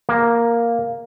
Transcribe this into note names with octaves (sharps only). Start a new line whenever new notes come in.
A#3